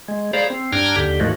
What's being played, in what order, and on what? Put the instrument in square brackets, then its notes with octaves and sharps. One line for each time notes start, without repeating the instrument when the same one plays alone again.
[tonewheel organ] G#3
G#4 C5 D5 F5 A#5 B5
C4
G2 D4 G5 A#5 F6 G#6
D#2 D3 G4
G#2 D#3 F3 G#3 A3 F#4